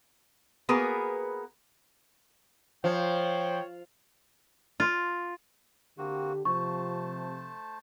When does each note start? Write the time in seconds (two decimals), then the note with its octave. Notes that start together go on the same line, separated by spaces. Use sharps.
0.69 A#3 B3 F#4 G#4 A#4 B4
2.84 F3 C5 C#5 G5
4.80 F4
5.98 D3 A#3 C4 F#4 G4
6.45 C3 F3 A3 C5 A5 C#6